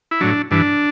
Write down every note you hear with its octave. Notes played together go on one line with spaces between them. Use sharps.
E4
A2 F#3 D4
G2 E3 D4